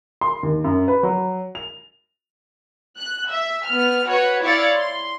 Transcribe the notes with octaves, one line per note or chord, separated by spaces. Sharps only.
C6
D#2
F#2
B4
F#3
F7
F#6
E5
B3 F6
F#4 B4 C#5
E4 C#5 D5 F5 A6 C#7
C6